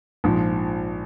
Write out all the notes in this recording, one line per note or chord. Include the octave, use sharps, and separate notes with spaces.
A#1 G#2 F3